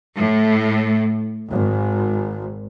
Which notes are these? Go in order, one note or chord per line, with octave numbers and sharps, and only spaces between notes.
A2
G#1